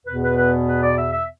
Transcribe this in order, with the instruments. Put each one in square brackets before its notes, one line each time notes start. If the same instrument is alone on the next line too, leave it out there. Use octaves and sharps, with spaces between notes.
[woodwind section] E2 B2 B3 B4
B4
B4
B4
D5
E5
E5